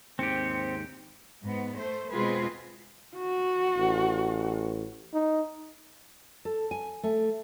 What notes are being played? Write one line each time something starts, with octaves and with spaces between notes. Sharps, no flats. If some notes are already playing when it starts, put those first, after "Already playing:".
D#2 G#2 C4 G4 C#7
G#2 B3
A3 C5
B2 G#3 C4 F4 G#4 B4
F#4
A1
D#4
A4
G#5
A3